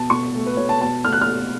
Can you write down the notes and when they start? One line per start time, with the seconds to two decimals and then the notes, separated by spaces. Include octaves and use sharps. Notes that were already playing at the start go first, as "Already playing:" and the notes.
Already playing: B2 A5
0.10 B2 C#6
0.35 A3
0.46 B4
0.57 B2 C#5
0.69 A5
0.81 B2 A5
1.05 A3 F6
1.13 F#6
1.21 F6
1.28 B2